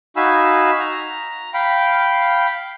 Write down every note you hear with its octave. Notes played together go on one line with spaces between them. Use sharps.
D#4 F#4 F5 G#5 B5 E6
A#5
F5 G5 B5